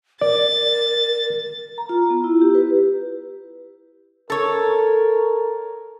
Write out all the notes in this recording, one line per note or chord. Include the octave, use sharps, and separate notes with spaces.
A#4 D5 A6
A#5
F4
B3
E4
G4
B4
A4 A#4 C#5